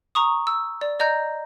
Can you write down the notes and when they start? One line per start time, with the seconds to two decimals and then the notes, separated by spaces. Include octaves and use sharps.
0.15 A#5 C#6 D#6
0.47 E6
0.81 D5
0.99 D5 D#5 A#5 G6